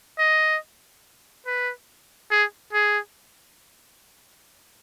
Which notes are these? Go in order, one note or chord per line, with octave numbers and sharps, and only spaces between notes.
D#5
B4
G#4
G#4